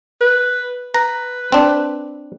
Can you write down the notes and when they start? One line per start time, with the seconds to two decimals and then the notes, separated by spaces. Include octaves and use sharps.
0.21 B4
0.94 B4 A#5
1.52 C4 D4